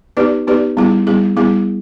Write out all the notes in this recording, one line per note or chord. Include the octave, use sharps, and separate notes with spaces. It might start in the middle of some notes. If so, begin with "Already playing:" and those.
B3 D#4 G4 B4 D5
B3 D#4 G4 B4 D5
G3 B3 E4 G#4
G3 B3 E4 G#4
G3 B3 E4 G#4